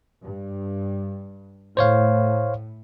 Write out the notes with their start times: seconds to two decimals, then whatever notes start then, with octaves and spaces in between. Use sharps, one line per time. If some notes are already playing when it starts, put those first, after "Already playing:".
0.23 G2
1.77 A2 C5 C#5 F5